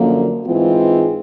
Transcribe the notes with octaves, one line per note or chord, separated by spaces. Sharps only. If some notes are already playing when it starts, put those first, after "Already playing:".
Already playing: F#2 D3 F3 A#3
G#2 E3 G#3 C4 F4